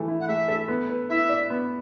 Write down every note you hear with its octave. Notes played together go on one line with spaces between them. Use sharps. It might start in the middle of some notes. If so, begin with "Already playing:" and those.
Already playing: E3 A3 A4
E4
F#5
A3 E5
A4
B3
B4
E4 E5
D5
B3